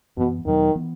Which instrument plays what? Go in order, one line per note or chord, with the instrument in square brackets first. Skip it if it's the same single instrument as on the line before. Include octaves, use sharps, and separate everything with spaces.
[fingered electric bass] F#2 E3 B3 [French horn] B2
[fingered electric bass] E2 B2 F#3 B3 [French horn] D#3
[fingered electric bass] E3 B3